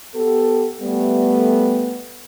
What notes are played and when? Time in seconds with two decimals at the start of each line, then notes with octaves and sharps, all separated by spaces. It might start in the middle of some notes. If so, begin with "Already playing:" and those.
0.15 B3 G4 A4
0.81 G3 A3 B3